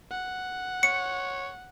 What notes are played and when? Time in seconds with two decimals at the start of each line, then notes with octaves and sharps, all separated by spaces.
0.11 F#5
0.83 C#5 C#7